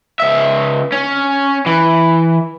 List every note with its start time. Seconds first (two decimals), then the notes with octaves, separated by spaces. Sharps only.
0.20 C#2 E5
0.92 C#4
1.66 E3